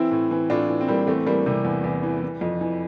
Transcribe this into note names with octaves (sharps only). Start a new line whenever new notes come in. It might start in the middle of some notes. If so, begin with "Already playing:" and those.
Already playing: E3 C4 E4
A2
E3
A2 D4 F4
E3
C4
A2 G3 A#3
E2 A3 C4
E3 G3 A#3
C3 G3
E2
E2
E3
E3
F2
E3